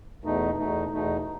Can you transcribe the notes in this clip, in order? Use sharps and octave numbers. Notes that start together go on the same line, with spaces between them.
E2 B2 A3 D#4
E2 B2 A3 D#4
E2 B2 A3 D#4